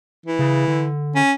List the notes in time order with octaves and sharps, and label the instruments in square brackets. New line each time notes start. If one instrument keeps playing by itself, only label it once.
[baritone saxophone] E3
[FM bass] C#3
D3
[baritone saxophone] C#4